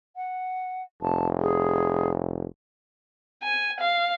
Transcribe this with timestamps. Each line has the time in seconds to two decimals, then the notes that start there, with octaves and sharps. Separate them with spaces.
0.16 F#5
1.02 F1 A5
1.41 G#4
3.42 G#5
3.80 F5